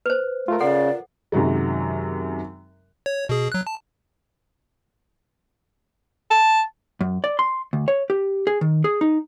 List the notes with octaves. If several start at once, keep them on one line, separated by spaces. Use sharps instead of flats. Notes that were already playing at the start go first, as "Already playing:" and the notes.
B4 C5
A3 F4 A#4
C#3 A4 D5 F#5
F#2 C3 D#3 F#3 G#3
C#5
B2 G#4
F#3 F#6
A5
A5
F#2
D5
C6
D2
C#5
G4
G#4
D#3
G#4
D#4